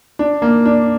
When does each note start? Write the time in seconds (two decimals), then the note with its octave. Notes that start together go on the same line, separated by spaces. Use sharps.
0.19 D4
0.42 A#3
0.66 D4